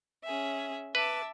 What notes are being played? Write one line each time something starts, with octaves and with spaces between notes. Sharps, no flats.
C#4 G#4 E5
B4 E5 A5 D6